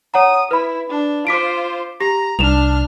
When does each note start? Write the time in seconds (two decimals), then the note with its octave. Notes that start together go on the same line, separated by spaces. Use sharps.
0.14 C#5 F#5 A#5 D#6
0.51 E4 B4 B5
0.90 D4
1.27 F4 C5 D6 B6 D7
2.01 G4 A#5 A#6
2.39 C2 D4 F6 E7 F7